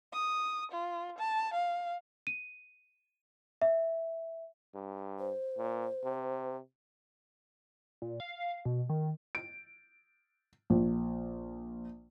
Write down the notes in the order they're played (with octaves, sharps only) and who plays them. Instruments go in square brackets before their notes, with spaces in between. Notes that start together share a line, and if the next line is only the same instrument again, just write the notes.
[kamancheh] D#6
F4
A5
F5
[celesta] D#7
E5
[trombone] G2
[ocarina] C5
[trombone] A#2
C3
[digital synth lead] A#2
F5
B2
D#3
[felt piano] D7
A#1